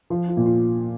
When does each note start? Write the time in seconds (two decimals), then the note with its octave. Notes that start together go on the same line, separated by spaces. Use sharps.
0.10 F3 F4
0.28 F4
0.37 A#2
0.45 F4